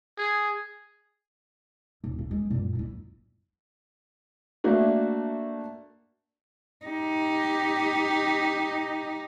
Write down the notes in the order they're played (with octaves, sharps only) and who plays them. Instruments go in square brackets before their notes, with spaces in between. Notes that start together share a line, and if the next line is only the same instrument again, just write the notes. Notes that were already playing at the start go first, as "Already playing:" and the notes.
[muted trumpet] G#4
[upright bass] D#1
A3
G#3
F#2 A#2
C#4 E4
[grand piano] A3 A#3 D4 F#4
[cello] D#4 G4